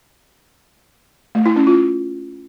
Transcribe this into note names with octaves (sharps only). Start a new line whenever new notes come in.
A3
E4
C#4
F4